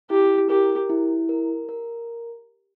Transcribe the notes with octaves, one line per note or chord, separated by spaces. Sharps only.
E4 G4
G4 A#4
E4
A#4
A#4